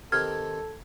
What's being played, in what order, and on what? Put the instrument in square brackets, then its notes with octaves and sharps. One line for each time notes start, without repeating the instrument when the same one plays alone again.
[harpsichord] D#3 C4 G4 [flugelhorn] A4 [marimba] F6 [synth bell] G#6